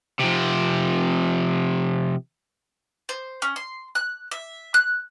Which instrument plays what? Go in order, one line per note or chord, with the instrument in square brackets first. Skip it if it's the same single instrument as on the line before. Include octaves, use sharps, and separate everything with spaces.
[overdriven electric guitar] C3 F3
[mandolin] C5
C#4
C6
F#6
E5
F#6